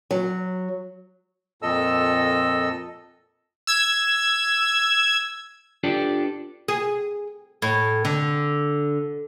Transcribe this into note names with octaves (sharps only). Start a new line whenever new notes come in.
F#3
F2 A#2 A4 D#5 E6
E6 G#6
D4 F4 G4 A4 B4 D5
G#4
A2
D3